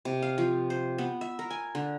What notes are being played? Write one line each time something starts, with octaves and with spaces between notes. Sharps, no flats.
C3
F5
F3
C5
B3
E5
A#4
G#5
D3